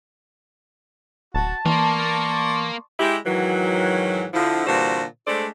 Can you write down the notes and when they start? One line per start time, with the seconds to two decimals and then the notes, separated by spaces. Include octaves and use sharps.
1.34 D1 F#4 A5
1.66 E3 A#3 A#4 D5 C6 C#6
2.99 G#3 E4 G4
3.26 G#2 D#3 E3 F#3
4.34 D3 F3 E4
4.67 A#2 D3 E3 G3 F#4 C5
5.27 G#3 A3 D4 A4 C5 D5